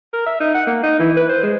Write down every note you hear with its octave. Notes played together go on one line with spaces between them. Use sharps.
A#4
E5
D#4
F#5
A#3
D#4
E3
B4
C5
G#3